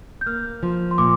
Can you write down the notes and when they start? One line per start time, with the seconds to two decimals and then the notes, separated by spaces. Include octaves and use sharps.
0.21 G6
0.26 A#3 F6
0.63 F3
0.91 C6
0.98 A#2 D6